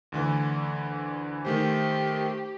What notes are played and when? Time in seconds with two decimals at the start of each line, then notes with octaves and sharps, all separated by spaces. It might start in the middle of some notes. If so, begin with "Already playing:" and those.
0.12 D2 D3 E3
1.45 D#3 A3 G4 C5